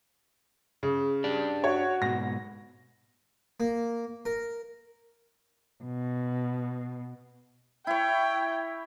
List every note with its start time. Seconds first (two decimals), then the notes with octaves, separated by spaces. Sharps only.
0.83 C#3
1.24 D4 G4 D5
1.64 F#4 C#5
2.02 G#2 B2 A#6
3.60 A#3
4.25 A#4
5.83 B2
7.87 E4 C#5 G5